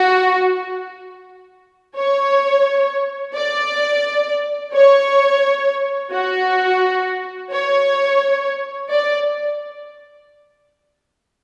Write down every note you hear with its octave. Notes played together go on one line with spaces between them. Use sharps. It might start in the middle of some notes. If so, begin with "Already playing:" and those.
Already playing: F#4
C#5
D5
C#5
F#4
C#5
D5